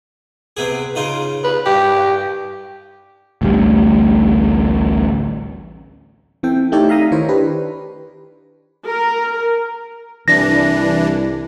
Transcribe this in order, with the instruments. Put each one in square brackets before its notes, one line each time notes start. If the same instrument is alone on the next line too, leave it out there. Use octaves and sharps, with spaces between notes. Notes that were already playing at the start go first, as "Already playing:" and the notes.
[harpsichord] C3 B3 G#4
C#3 D#4 F4
[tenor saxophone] B4
[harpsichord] G2 [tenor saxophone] G4
[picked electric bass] A1 D2 G3
[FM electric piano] E3 C4 A4 G5
A3 D#4 G4 A4 C#5 D5
E5 F5 A#5 D#6
D#3 D#4 E4 C5 C#5
D4 G4 B4
[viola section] A#4
[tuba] C2 [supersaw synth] E3 D4 [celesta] A#6